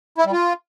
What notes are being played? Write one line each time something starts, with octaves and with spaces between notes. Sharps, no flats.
E4
G3
F4